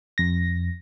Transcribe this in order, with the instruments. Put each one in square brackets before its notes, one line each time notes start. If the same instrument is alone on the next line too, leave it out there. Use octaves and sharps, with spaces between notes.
[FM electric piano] F2 A#6